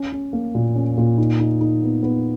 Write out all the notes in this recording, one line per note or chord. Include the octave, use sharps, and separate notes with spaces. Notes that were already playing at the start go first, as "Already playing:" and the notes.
Already playing: C#4
C#4
A#3
A#2
C#4
A#2
D#4
D#4
D#4
B3
B3